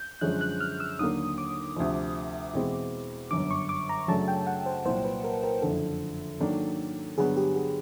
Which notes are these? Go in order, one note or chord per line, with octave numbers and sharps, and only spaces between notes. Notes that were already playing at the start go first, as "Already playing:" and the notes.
Already playing: G6
F#2 D3 F3 G#3 C#4 F#6
F#6
F6
E6
D#2 D3 F#3 A#3 D#6
D6
D2 C3 F3
E2 B2 G#3 C4 E4
G1 F#2 D3 D6
C#6
D6
A#5
F#2 C#3 F#3 A3 D4 A5
G5
F#5
C5
C2 A#2 F#3 C5
B4
A#4
A#4
F#1 F2 D3 A4
G#2 D#3 F#3 A#3 D4
G2 D3 F#3 B3 G#4
G4
G#4